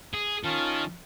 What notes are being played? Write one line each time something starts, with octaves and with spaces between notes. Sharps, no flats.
G#4
D#3 C#4 F4 A5